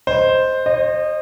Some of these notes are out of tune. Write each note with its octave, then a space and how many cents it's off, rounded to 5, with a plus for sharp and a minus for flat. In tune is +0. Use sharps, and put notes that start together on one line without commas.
C5 +0 D#5 +0
C5 +35 D#5 -25